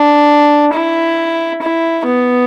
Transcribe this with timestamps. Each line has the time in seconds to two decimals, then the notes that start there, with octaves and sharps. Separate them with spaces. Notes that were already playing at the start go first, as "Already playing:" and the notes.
Already playing: D4
0.73 E4
1.62 E4
2.06 B3